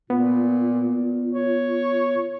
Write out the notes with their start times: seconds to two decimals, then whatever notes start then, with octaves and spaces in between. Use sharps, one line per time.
0.10 A#2 B3 F4
1.32 C#5